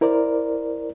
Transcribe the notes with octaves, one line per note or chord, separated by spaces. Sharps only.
E4 A#4 C5 D5